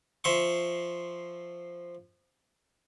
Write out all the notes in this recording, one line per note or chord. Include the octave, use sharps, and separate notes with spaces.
F3 E5 C6 C#6